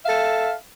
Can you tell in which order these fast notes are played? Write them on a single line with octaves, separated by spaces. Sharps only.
E5 F5 A4